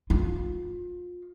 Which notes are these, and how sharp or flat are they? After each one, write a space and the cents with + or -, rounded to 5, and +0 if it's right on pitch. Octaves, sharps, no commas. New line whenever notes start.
F4 +25